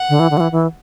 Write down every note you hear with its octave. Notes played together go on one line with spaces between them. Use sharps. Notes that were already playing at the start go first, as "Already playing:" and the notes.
Already playing: F#5
D3
E3
D3
F#3
E3
E3